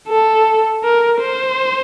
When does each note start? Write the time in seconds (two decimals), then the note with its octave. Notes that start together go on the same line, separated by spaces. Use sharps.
0.08 A4
0.84 A#4
1.21 C5